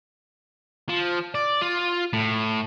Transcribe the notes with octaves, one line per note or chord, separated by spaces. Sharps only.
F3
D5
F4
A2